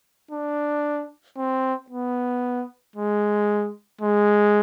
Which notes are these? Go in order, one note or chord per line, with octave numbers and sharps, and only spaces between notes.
D4
C4
B3
G#3
G#3